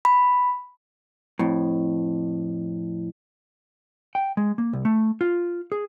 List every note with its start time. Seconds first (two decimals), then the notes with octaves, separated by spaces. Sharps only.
0.05 B5
1.39 F2 A2
4.15 G5
4.37 G#3
4.58 A#3
4.73 C2
4.85 A3
5.21 F4
5.72 G#4